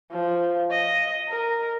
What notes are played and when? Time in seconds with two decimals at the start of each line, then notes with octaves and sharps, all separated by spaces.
0.12 F3
0.71 D#5
1.28 A#4